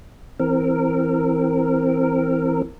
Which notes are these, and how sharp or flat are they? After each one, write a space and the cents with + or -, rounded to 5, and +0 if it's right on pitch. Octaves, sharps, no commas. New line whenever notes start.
E3 +0 C4 +0 A#4 -20